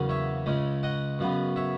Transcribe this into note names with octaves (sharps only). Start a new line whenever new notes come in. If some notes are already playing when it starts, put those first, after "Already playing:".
Already playing: E2 C#3 F#3 A#3 C#4
C#5 E5
C#2 C#3 G#3 C#4
D#5 F#5
F#2 C#3 F#3 B3
C#5 E5